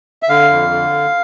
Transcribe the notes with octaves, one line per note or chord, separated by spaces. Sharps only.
E5
D3 F5
F2
D3